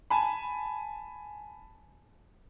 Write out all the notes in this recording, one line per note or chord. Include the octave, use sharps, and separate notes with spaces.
G#5 A5 B5